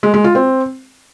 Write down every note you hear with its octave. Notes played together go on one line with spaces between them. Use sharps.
G#3
G#3
F4
C4